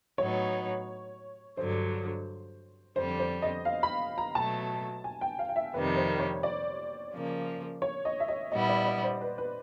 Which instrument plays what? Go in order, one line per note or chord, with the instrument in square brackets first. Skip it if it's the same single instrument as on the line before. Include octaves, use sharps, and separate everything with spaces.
[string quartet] A2 F#3 B3 D#4 [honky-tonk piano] C#5
[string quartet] G2 D3 F#3 [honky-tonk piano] C5
[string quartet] F2 D3 G3 [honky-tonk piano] C5
[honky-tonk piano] C5
D#5
F5
B5
A#5
[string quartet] B2 F#3 A3 [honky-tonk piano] A5
[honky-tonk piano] G#5
G5
F5
F5
E5
[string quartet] F2 C3 D#3 G3 [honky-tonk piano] B4
[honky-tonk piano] C5
C#5
D5
[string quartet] C#3 F3 A#3
[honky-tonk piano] C#5
D#5
E5
D#5
[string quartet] A#2 G3 B3 E4 [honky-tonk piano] D#5
[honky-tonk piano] D5
D5
C5
B4
B4